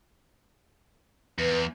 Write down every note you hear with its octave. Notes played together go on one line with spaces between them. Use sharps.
E2 B4